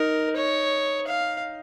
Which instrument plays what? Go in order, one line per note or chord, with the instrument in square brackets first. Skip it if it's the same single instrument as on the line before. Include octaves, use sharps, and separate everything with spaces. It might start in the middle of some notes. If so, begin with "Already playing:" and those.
Already playing: [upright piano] D#4 [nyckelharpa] A#4
[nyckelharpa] C#5
F5